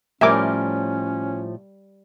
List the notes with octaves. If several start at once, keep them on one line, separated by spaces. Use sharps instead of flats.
A2 F3 G3 C#4 A#4 E5 G#5 D6